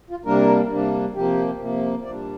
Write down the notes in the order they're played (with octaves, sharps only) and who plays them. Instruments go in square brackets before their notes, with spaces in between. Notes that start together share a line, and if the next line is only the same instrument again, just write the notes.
[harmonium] F4
C3 G3 A#3 D4 A#4
C3 G3 A#3 D4
C3 F3 A#3 G4
C3 F3 A#3
A#2 D5
G3 D4